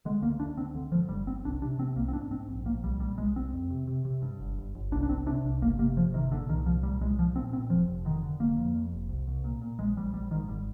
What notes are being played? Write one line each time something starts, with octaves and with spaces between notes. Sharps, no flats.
D3 G#3
D2 A#3
D2 D4
D2 C4
D3
G2 F3
G1 G3
G1 C4
C2 D4
C3 D4
C3 C4
C2 A#3
C4
G#2 D4
G#2 C4
A#1
A#1 A#3
C2 G3
A#2 G3
C2 G#3
C2 C4
F2
C3
C3
C3
G2
G1
G1
G1
C2 D4
D4
C2 C4
C3 D4
C2
G1 A#3
C3 A#3
G1 F3
C3 D#3
A#2 D3
C2 D#3
C2 F3
A#2 G3
C2 G#3
C2 F3
A#2 C4
A#2 C4
F1 F3
F1
D3 D#3
D3
F1 A#3
F2
F2
F1
C2
C2
A#2
A#2
A#1 G#3
A#1 G3
A#1 G3
G#2 D#3
G#1 G3